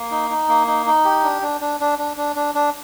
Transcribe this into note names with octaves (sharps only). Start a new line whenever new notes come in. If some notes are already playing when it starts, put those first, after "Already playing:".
Already playing: A#3
D#4
D#4
A#3
D#4
D#4
G4
D4
D4
D4
D4
D4
D4
D4
D4